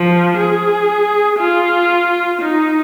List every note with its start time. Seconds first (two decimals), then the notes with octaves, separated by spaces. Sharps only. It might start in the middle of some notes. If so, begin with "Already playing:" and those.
Already playing: F3
0.37 G#4
1.39 F4
2.41 D#4